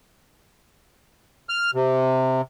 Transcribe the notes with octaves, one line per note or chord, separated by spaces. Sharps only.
F6
C3